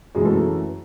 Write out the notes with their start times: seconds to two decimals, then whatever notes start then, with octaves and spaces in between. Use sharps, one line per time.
0.15 F#2 E3 G#3 G#4
0.25 A3 A4